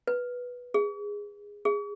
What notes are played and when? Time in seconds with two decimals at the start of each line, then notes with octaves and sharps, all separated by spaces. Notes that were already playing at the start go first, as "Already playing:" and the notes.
0.07 B4
0.74 G#4
1.65 G#4